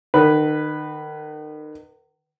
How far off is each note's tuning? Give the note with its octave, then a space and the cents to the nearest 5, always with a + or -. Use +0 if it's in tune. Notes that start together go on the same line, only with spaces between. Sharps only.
D#3 -35 B4 +0